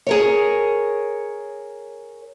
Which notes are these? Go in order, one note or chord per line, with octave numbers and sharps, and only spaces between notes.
G#4 A#4 C#5